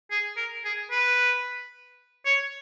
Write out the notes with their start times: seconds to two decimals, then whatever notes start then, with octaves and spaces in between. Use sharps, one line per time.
0.11 G#4
0.37 A#4
0.65 G#4
0.91 B4
2.26 C#5